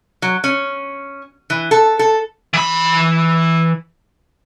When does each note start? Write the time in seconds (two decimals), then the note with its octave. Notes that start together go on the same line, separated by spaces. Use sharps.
0.22 F#3
0.44 C#4
1.50 E3
1.71 A4
1.99 A4
2.53 E3 B5